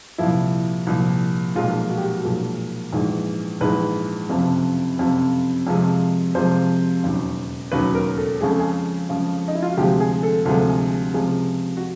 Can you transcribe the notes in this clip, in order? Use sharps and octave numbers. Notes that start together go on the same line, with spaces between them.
C2 A#2 F3 E4
C2 A#2 F3
B1 A#2 F3 G#3 F4
F#4
G4
F#4
B1 A#2 F3 G#3
A#1 G#2 E3 G#3
A#1 G#2 E3 G#3 B4
F#1 F2 C3 F3
F#1 F2 C3 F3
F2 C3 F3 G#3
F2 C3 F3 G#3 C5
E1 D#2 C#3 F#3
E1 D#2 C#3 F#3 B4
A#4
A4
F2 C#3 F3 G#3 G#4
A4
G#4
F2 C#3 F3 G#3
D#4
E4
F4
F#4
D2 C3 F3 G#3 G4
G#4
A4
D2 C3 F3 G#3 A4
G#4
C#2 C3 F3 G#3 G#4
F#4